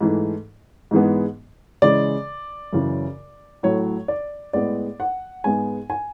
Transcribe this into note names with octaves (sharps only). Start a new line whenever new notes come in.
G#2 E3 A3
G#2 E3 G#3 B3
C#3 E3 G#3 D5
F#2 C#3 E3
A2 F#3 A3 C#5
D5
A2 G#3 B3 D5
F#5
G#2 G#3 B3 G#5
G#5